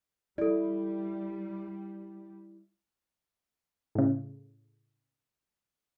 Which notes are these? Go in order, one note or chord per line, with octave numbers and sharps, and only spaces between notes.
G3 E4 A4 D5
A2 C#3